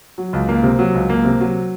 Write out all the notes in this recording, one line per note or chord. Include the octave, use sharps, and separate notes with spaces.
F#3
C#2
A#3
C3
F#3
C#2
A#3
C3
F#3